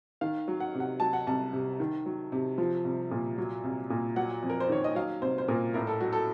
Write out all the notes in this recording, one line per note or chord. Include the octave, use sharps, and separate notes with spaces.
D#3 F5
F#3
F#5
C3
F#5
F#3 A5
F#5
C2 A5
C3
D#3
F#3
C3
F3
C2
A#2
F#3
C2
A#2
F#3 F#5
F2
A#4
C5
D#3 C#5
D#5
F#3 F5
C2 C5
C5
A#2 A#4
A2 A#4
A4
F#3 F#4
A4